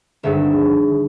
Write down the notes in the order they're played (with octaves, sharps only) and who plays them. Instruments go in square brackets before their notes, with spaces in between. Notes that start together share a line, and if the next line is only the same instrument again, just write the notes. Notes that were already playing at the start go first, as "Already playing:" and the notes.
[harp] G#1 G2 D3 E5